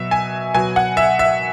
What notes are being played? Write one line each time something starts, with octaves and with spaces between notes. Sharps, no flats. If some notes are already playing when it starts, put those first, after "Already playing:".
Already playing: B2 F#3 E5
G#5
B2 F#3 G#5
F#5
E5
E5